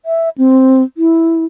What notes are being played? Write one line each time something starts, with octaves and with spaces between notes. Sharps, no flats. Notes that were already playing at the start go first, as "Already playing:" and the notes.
E5
C4
E4